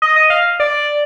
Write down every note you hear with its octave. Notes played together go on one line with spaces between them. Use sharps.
D#5
D#5
F5
D5